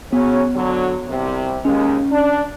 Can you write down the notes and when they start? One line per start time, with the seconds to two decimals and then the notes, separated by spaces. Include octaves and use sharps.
0.13 C#3 F#3 B3 C#4
0.55 D3 F#3
1.08 C2 C3
1.65 D#2 G#3 C#4
2.12 D4